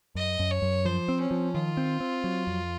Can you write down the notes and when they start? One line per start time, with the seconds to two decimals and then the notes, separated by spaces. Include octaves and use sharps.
0.15 F#2 D#5
0.39 F#2
0.50 C#5
0.62 F#2
0.85 F3 C5
1.09 C4
1.20 C#4
1.31 F3
1.55 D#3 F4
1.77 C4
2.00 C4
2.24 F#3
2.47 F2